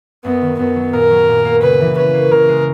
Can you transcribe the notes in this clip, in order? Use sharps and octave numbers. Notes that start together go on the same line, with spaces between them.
F#2 B3
D#3
F#2 B3
F#3
A#2 A#4
F#3
A#2
A#3
C#3 B4
E3
C#4 B4
A#3
C#3 A#4
G#3